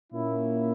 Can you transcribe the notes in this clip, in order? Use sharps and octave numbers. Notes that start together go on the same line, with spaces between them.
A#2 A#3 C#4 E4